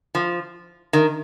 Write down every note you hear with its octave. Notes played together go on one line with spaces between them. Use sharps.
F3
D#3